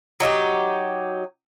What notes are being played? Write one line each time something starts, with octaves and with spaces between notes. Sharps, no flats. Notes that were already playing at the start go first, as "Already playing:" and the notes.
F#3 D#4 E4 G4